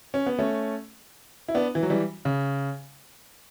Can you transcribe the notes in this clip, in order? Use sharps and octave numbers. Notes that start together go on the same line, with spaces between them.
C#4
B3
A3 C#4
E4
B3 D4
E3
F#3
E3 G3
C#3